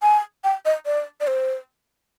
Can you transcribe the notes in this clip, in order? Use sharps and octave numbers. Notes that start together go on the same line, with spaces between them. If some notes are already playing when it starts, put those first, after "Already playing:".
G#5
G5
D#5
D5
D5
C5